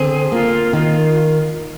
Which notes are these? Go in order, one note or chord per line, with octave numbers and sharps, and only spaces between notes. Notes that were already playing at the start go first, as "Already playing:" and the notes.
Already playing: D3 C4 G#4
A#3 F4
D#3 F4